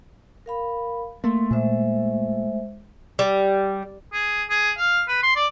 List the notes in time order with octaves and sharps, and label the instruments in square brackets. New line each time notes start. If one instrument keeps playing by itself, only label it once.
[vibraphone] A#4 F5 B5
[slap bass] A3 [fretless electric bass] A#3 [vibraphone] C6
[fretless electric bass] A#2 [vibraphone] G#3 C5 E5
[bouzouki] G3
[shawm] G#4
G#4
F5
B4
C6
D5